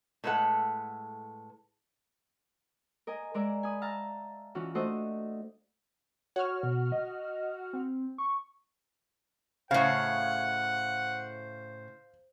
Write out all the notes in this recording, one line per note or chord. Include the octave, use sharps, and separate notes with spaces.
A2 G#3 A4 B4 F#5
A#4 D#5 G#5
G#3 A#4 D5 E5
G#5 B5 D#6
E5 F5 A5 A#5
E3 C#4 F4 F#4
A3 D4 F#4 C5 D#5 E5
F#4 C#5 F6
B2
D#5
C4
C#6
A2 C#3 C5 F5 F#5